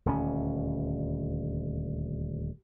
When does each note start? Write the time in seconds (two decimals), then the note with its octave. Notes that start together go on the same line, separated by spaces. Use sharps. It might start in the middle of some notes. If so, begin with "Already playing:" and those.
0.06 D#1 D2 C#4